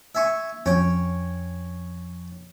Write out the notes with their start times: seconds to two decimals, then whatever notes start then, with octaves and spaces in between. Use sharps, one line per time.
0.15 E5 G#5 C#6
0.66 F2 C#4 C#5 G5